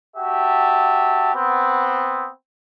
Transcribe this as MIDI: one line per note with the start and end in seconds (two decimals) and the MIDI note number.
0.17 1.33 66
0.17 1.33 67
0.17 1.33 76
0.17 1.33 81
1.35 2.30 59
1.35 2.30 60